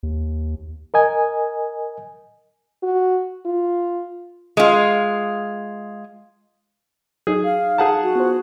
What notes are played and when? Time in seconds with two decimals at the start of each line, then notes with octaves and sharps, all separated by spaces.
0.03 D#2
0.94 A#4 D#5 G#5
2.83 F#4
3.46 F4
4.57 G#3 F4
7.27 F#3 D#4 G#4
7.45 F5
7.78 G#4 F#5 A5
8.03 F#4
8.15 B3 F4 C5